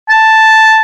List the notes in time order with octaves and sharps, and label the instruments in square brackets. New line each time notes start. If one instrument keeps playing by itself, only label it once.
[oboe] A5